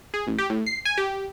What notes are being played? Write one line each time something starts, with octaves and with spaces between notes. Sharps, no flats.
G#4
A1
G4
A2
C7
G#5
G4